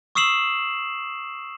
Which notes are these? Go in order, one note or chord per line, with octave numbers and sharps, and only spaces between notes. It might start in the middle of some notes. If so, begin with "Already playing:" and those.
C#6 D#6 E6 C7 E7 F#7